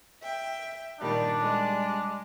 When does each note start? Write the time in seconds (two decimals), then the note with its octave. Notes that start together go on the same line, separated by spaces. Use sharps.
0.22 E5 G5
1.01 A#2 D#3 G3 D4
1.36 G3 G#3